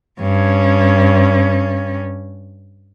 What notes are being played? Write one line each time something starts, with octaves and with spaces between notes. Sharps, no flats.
G2 C#4